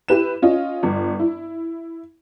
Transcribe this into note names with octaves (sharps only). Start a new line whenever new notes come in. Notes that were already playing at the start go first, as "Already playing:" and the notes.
E4 G4 B4 E7
C#4 F4 D#5
G1
E4